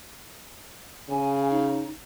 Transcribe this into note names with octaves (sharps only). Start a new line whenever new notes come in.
C#3 G#5
D#4